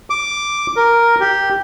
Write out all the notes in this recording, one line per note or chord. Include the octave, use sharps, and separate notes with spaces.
D6
A#4
G4